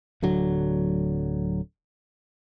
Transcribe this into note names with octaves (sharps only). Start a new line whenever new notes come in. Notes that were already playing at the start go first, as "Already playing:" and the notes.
D1 D3 F#3